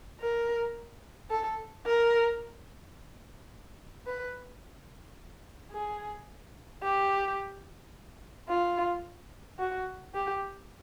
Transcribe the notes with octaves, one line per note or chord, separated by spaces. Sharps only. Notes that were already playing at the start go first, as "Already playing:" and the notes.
A#4
A4
A#4
B4
G#4
G4
F4
F#4
G4